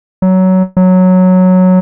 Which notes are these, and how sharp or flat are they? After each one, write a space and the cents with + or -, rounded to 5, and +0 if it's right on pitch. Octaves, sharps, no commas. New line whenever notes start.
F#3 +15
F#3 -5